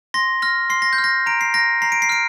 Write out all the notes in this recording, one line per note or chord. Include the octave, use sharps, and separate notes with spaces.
C6 A#6
F6 A#6
C6 C7
A#6
G6
F6
A#6
A#5 D7
C7
F6 A#6
A#5 C7
D7
C7
F6 D7